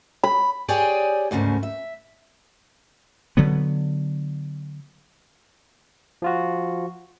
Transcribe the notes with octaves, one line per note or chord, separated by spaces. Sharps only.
B5
G4 G#4 C#5 D5 G5 G#5
D2 G#2 C#3 A3 A#3
E5
D3 F#3 B3
F3 F4 F#4